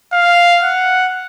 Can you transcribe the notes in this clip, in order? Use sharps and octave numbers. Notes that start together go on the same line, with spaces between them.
F5
F#5